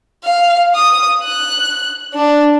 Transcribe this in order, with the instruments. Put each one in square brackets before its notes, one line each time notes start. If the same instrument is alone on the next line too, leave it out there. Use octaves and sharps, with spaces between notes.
[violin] F5
D#6
F#6
D4